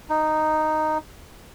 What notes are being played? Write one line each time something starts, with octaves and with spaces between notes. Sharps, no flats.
D#4